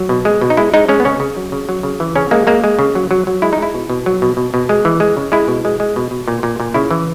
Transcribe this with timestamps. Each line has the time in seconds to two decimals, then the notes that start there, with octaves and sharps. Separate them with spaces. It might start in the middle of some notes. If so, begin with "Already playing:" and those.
Already playing: F#3
0.09 B2
0.25 G#3
0.41 B2
0.50 D#4
0.57 G#3 E4
0.74 G#3 D#4
0.89 G#3 C#4
1.00 B3
1.05 C#3 C#4
1.20 C#3
1.37 F#3
1.52 C#3
1.69 F#3
1.83 C#3
2.00 E3
2.16 C#3 C#4
2.31 G#3 A#3
2.47 G#3 A#3
2.64 G#3
2.79 C#3
2.95 F#3
3.11 F#3
3.27 F#3
3.42 G#3 E4
3.53 D#4
3.58 G#3 E4
3.74 B2
3.90 B2
4.06 F#3
4.22 B2
4.37 B2
4.54 B2
4.69 G#3
4.85 E3
5.00 G#3
5.17 C#3
5.32 G#3 E4
5.48 B2
5.65 G#3
5.80 G#3
5.96 B2
6.11 B2
6.28 A#2
6.43 A#2
6.60 A#2
6.74 C#3 E4
6.91 E3